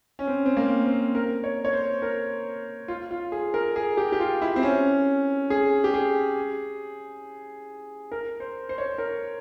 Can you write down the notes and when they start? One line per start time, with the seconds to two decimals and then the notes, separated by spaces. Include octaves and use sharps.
0.19 C#4
0.28 C4
0.46 C4
0.57 A#3
0.86 C4
1.15 A#4
1.44 C#5
1.65 C#5
1.73 C5
2.02 A#4
2.88 F4
3.11 F4
3.32 G#4
3.54 A#4
3.76 G#4
3.97 G4
4.12 G4
4.20 F4
4.42 E4
4.56 C4
4.63 C#4
5.50 G#4
5.84 G4
5.94 G#4
8.12 A#4
8.40 C5
8.69 C5
8.78 C#5
8.86 C5
8.98 A#4